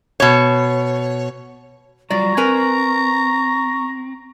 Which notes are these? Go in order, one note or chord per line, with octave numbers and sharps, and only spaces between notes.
B2 C#5
F#3 G3 F4 D5 A#5 C#6
C4 A#4 B4 G#5